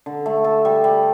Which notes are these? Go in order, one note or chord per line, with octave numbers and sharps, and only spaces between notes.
D3
A3
A4
G3
G3